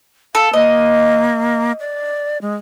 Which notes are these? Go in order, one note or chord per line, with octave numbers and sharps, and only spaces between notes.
A4 F5
A#3 D#5
D5
G#3